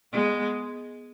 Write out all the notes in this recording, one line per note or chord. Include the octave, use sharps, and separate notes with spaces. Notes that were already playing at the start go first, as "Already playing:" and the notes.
G#3 B3